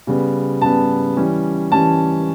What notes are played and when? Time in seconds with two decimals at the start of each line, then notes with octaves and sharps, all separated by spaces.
0.07 C#3 G3 B3
0.61 C#3 G3 B3 A5
1.17 E3 G3 C#4
1.72 E3 G3 C#4 A5